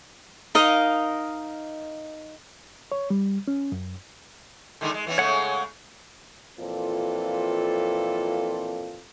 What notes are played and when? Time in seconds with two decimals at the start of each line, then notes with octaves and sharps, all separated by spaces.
0.55 D#4 A#4 D#5 F5
2.92 C#5
3.10 G3
3.48 C#4
3.72 F#2
4.81 D3 D#3 G#3
4.94 G#3
5.07 E3 B3 C#4
5.18 C#3 G#3 A3 C#5 F#5
6.59 F2 A#2 E3 C4 F4 A4